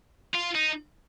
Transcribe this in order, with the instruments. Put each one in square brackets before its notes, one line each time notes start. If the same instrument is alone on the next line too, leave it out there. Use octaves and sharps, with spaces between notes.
[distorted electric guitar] F4
D#4